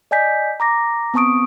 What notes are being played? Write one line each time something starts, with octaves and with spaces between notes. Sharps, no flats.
D5 D#5 G#5 G6 B6
A#5 D6 A#6
B3 C4 A5 C#6 D#6 D7